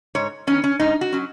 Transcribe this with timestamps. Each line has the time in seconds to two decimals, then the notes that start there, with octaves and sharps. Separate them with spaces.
0.15 G#2 C#5
0.47 D#3 B3 C#4
0.64 C#4
0.80 G#2 D#4
1.01 F#4
1.13 F#3 C#4